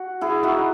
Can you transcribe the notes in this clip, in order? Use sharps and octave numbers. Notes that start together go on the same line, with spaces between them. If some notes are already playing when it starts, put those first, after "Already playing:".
Already playing: F#4
E4 G#4
D#4 F#4